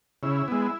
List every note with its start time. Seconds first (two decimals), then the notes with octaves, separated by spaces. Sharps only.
0.23 C#3 E4
0.48 G#3 B3